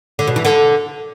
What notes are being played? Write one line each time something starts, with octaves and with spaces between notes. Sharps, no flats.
D3
B2
E3
D3